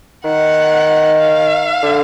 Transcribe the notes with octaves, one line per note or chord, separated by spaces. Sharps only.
D#3 F#5
F5
D3